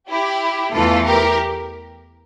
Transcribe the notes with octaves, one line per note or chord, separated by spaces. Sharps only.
E4 G4
E2 E3 A3 F4 A4
G4 A#4